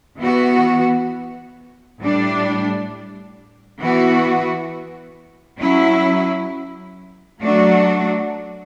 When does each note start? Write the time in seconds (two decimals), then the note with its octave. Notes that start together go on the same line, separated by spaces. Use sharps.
0.20 E3 B3 F#4
2.00 A2 G3 D4
3.80 E3 B3 F#4
5.60 F#3 C#4 E4
7.41 F#3 A3 D4 F#4